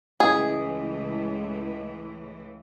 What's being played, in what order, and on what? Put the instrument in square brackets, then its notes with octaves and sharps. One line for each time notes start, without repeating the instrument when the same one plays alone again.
[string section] C#2 A2 E3 [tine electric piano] C#4 E4 D#5 [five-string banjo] G#4